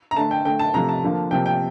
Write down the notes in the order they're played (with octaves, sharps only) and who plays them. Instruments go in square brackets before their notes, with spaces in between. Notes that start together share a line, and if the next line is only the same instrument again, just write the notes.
[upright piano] A#5
D3 A3 A5
G5
D3 A3 G5
A5
C3 F3 A3 A#5
A5
D3 F3 A#3
C3 F3 A#3 G5
G5